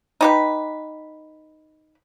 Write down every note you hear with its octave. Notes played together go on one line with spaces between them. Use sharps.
D#4 G4 B4